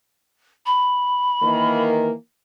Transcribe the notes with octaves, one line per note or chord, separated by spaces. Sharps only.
B5
D#3 E3 A#3